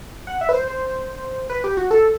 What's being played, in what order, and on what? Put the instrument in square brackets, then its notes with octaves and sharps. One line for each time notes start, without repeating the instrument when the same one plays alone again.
[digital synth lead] F#5
E5
B4
C5
C5
B4
G4
F#4
A4